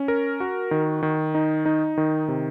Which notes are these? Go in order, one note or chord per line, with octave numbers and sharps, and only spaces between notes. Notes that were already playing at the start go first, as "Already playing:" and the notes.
Already playing: C#4
A#4
F#4
D#3
D#3
D#4
D#4
D#3
C3